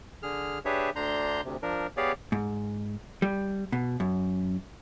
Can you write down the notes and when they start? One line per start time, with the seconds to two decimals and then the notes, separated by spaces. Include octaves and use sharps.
0.23 D3 G#4 F6
0.65 D4 G4 G#4 B4 C#5 E5
0.96 D2 D3 D4 A#5 C6 G6
1.45 D2 C3
1.62 F3 D4 A#4
1.97 B3 G4 G#4 C#5 D5 F5
2.32 G#2
3.22 G3
3.72 B2
4.00 F#2